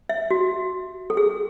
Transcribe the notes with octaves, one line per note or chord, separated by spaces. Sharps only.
E5
F#4
A4
G#4